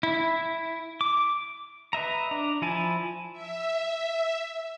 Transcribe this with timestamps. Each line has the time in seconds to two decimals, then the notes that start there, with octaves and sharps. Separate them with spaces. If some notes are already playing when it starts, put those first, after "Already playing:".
0.03 E4
1.01 D6
1.93 B4 D#5 E5 A#5
2.31 D4 A#5
2.62 F3 E4 G#5 A5
3.33 E5